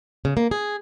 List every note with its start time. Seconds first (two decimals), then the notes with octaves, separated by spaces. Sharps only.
0.25 C#3
0.37 A#3
0.51 G#4